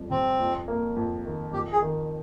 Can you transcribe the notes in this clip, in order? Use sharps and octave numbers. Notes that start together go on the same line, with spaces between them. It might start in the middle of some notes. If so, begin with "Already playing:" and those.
Already playing: F2 G3
C3 C4
F2
A#3
F2
D#3
F2 G4
G#4
D#3